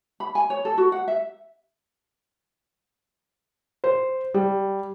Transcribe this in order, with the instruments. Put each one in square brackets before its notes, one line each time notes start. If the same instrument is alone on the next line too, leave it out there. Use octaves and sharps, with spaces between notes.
[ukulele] B5
G#5
C#5
A4
F#4
F#5
E5
[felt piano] C5
G3